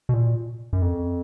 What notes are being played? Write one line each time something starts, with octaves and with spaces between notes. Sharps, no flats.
B2
A#2
F#2
F2